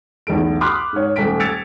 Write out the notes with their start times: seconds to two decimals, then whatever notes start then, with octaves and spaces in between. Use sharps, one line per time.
0.27 B1 E2 A3 A4 D7
0.61 B5 C6 D6 D#6 F6 F#6
0.93 G#2 C#5
1.16 D#1 A3 G#5 B6 D7
1.40 E6 G#6 A6 C#7 D7 F7